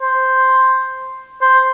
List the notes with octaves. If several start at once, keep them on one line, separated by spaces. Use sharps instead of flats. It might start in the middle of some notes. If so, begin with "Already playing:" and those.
C5
C5